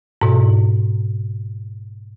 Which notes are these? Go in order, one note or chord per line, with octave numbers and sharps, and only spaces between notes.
G#2 B2